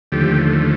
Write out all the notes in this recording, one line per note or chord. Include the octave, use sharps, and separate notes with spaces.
D#2 D3 F3 A3 G4